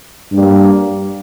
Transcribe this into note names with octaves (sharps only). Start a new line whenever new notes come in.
G2 G3 A#3